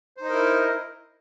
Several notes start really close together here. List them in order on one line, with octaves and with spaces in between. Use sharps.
C5 D#4 D#5 A#4 E4